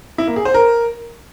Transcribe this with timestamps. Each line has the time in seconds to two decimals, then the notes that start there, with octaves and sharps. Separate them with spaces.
0.18 E4
0.27 A#3
0.36 G#4
0.45 C5
0.54 A#4